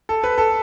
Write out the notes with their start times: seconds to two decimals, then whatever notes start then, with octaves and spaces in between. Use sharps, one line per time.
0.09 A4
0.24 B4
0.38 A4